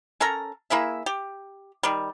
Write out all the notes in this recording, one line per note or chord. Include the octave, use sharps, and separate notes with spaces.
C#4 A4 A#4 A#5
A#3 E4 G#4 E5
G4
D#3 G3